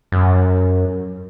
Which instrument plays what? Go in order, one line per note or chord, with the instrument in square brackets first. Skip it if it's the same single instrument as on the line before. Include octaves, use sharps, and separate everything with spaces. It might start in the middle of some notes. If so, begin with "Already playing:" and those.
[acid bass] F#2